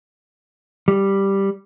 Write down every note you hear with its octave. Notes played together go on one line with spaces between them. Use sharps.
G3